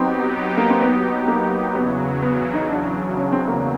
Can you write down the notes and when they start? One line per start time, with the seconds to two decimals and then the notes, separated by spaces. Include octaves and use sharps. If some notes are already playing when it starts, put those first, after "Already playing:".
Already playing: F#3 B3 C4 D#4 G4
0.57 A#3
0.70 C4
0.81 B3
1.28 A#3
1.75 E2 C#3 F#3 B3
2.22 B3
2.54 D#4
2.69 D4
3.16 C#4
3.32 C4
3.48 A#3